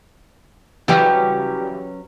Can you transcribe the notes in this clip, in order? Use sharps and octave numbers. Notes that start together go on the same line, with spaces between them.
C#3 E3 F#3 G3 C#4 G4 B4